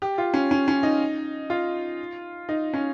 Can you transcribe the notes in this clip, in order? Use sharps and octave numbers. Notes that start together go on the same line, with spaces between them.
G4
F4
C#4
C#4
C#4
D#4
F4
D#4
C#4